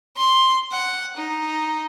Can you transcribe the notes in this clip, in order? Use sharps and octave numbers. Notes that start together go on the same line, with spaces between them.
C6
F#5
D#4